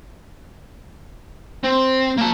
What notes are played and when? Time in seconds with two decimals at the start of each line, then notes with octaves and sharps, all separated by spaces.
1.64 C4
2.17 A#3 A5